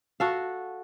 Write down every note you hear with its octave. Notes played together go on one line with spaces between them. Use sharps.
F#4 A4 F5